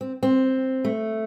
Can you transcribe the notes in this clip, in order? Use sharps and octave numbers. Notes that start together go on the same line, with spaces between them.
C4
C4
A3